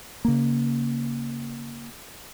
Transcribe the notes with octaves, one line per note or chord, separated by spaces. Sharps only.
C#3 A#3